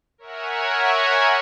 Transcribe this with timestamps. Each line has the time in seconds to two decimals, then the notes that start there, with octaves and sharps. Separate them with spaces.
0.18 A#4 C#5 E5 F#5 G#5